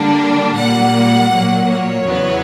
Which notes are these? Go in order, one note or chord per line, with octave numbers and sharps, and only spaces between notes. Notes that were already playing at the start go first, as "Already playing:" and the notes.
Already playing: D3 G3 A#3 D4
A#2 G3 A#3 F#5
A#2 F#3 A#3
C#5
E2 C#3 F#3 B3